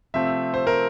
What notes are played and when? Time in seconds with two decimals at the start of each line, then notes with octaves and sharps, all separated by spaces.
0.14 C3 F3 A3 C4 E5
0.54 C5
0.67 A#4